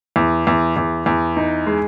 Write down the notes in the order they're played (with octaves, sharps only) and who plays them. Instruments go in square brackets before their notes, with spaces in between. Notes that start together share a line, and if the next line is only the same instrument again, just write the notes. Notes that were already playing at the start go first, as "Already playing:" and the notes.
[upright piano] E2
E2
E2
E2
D#4
G#3